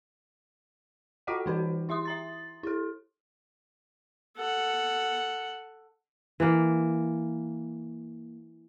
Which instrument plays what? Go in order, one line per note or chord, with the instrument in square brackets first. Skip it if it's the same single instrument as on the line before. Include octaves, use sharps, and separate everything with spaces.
[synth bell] F4 F#4 A4 D#5 F#5 G5
E3 D#4 B4
E4 E5 C6 D#6
E5 A#5 A6
E4 A4
[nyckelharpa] A4 F#5
[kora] E3 A#3